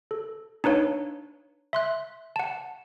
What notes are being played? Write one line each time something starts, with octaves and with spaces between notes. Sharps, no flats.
A4
D4 D#4 B4 C#5 F5
E5 C6 F#6
F#5 A5